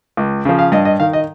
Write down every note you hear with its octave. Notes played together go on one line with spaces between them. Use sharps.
C#2
C#3 F3
F5
G2 D#5
D#5
D#3 F5
D#5